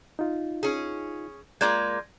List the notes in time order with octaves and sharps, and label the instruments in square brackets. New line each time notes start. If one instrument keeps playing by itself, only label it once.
[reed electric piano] D#4 F4
[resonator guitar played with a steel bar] C#4 G#4
[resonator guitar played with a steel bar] G#3 A#3 F4 [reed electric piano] D5 G6 G#6